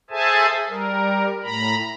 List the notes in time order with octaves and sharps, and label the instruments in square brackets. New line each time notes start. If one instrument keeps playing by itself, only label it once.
[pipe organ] G#4 A4 C5 E5 G#5 A5
G3 A#4
A2 A#5 B5